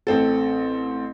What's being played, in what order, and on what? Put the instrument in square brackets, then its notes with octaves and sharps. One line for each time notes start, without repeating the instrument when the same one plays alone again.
[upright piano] A1 C4 A4